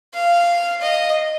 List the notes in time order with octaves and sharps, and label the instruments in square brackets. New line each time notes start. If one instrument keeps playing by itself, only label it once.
[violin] F5
D#5